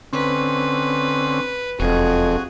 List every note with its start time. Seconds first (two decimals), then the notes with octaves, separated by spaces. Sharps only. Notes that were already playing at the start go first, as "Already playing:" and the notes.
0.13 D3 C4 C#4 B4
1.80 E1 F2 F#4 G#4